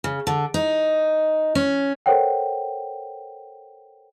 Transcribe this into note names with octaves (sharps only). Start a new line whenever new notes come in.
C#3
D3
D#4
C#4
A4 A#4 C5 C#5 F#5 G5